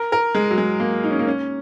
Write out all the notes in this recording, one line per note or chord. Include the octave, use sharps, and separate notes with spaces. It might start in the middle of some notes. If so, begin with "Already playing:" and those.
Already playing: A#4
A#4
G#3
F#3
G#3
A#3
D#4
C#4
A#3
C#4